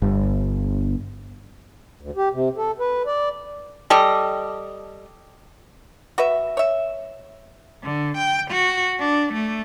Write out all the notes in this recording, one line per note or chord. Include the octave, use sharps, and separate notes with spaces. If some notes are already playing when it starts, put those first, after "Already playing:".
G1
D2
G4
C3
A4
B4
D5
G3 A4 D#5
F#4 B4 E5
C#5 E5
D3
G5
F#4
D4
A3